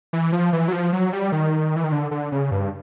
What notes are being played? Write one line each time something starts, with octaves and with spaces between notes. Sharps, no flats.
E3
F3
E3
F#3
F3
F#3
G3
D#3
E3
D#3
D3
D3
C#3
G2